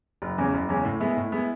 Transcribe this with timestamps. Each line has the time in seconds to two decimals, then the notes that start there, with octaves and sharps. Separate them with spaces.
0.22 F#1
0.38 E2 C#3 G#3 C#4
0.54 F#1
0.69 E2 C#3 G#3 C#4
0.85 A2
1.00 G#3 B3 E4
1.17 A2
1.32 G#3 B3 E4